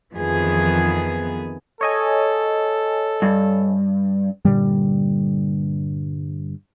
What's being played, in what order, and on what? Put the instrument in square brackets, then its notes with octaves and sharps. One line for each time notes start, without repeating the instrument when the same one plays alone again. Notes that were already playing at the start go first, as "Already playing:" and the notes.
[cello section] F2 D#3 E3 B3 G#4
[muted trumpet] A4 [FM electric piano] C#5 D#5 G#5
[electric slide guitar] G2
[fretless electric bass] G2 A#2 D3 G3